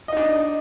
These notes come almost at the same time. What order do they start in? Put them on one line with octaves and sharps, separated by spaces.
D#5 D#4 D4